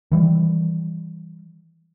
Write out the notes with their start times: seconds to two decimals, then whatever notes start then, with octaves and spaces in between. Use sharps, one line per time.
0.11 D#3 E3 G3